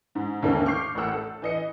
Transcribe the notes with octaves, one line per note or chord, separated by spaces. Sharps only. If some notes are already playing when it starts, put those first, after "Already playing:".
G#2
D#2 G#2 D3 A3 A#3 C#4
C#6 D6 F6 G6 C7
A1 A2 A#4 F#5 E6
A4
E3 D#5 C#7